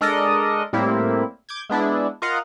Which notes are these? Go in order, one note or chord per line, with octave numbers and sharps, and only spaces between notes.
G#3 D4 A4 A#4 D5 D#5
A2 G3 A#3 C4 E4
D6 G6 G#6
G#3 B3 D4 E4
F4 A#4 D#5 F5 F#5